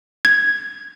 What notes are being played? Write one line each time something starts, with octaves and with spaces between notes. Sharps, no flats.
G#6